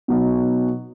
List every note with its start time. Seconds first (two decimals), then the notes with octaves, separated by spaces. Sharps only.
0.08 B2 F#3 B3 D#4